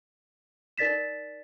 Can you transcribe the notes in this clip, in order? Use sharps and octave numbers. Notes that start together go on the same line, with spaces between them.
D#4 A#4 D5 A6 B6 E7